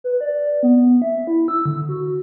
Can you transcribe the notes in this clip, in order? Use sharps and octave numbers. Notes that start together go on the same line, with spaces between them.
B4
D5
B3
E5
E4
E6
D3
F#4